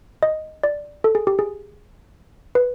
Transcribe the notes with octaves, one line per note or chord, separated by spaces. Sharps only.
D#5
D5
A4
G#4
G4
G#4
B4